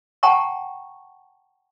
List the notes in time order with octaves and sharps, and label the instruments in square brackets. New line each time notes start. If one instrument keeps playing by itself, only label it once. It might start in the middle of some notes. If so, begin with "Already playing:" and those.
[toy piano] F#5 G5 A5 A#5 C#6